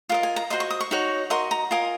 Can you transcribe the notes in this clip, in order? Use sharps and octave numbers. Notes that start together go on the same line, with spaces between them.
F4 A#4 D#5 F5
G#5
A#5
F#4 C5 D#5 C6
C#6
D#6
C#6
D#4 F#4 C#5
F#4 A#4 D#5 C6
A#5
F4 A#4 D#5 G#5